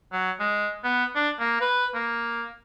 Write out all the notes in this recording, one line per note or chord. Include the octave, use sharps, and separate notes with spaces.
F#3
G#3
B3
D4
A#3
B4
A#3